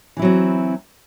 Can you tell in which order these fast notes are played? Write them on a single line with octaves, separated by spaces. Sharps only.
E3 E4 F#3 C4